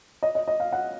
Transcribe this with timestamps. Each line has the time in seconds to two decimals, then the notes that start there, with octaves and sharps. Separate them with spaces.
0.23 D#5
0.35 D#5
0.48 D#5
0.60 F5
0.72 F#5